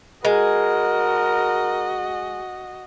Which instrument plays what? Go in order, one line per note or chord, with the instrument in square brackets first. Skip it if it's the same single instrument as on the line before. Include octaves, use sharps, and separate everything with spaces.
[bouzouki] G#3 [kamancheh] F#4 D#5 [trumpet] A#4